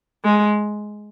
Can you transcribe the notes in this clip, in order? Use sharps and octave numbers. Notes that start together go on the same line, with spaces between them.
G#3